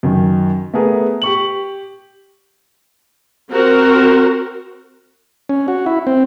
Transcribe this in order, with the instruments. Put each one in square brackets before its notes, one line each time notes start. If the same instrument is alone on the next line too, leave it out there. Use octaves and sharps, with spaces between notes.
[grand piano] F#2 D#3
A3 B3 G#4 A#4 B4
G4 C#6 F#7
[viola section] C4 F#4 A#4
[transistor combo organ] C#4
F#4
E4
C4